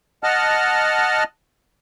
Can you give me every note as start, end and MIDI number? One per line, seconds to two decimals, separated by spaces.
0.23 1.24 75
0.23 1.24 78
0.23 1.24 81
0.23 1.24 89